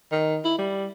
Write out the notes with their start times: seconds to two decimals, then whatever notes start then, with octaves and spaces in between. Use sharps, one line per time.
0.12 D#3
0.45 E4
0.59 G3